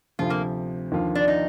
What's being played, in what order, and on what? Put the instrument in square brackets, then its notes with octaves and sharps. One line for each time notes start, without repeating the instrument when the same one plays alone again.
[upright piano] D2 C3 F3 C4 [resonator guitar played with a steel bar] F4
[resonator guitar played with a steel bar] A#3
[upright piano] D#2 D3 F3 A#3 F4
[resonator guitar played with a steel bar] D4
D#4